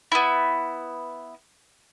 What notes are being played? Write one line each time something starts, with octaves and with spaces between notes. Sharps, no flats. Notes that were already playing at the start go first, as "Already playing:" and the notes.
B3 E4